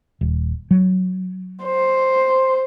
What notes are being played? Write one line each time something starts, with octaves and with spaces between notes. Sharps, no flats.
D#1
F#3
C5